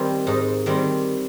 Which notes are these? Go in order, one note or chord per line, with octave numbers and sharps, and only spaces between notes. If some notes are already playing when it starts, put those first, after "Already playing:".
Already playing: D#3 G3 C4
G#2 D#4
D#3 G3 C4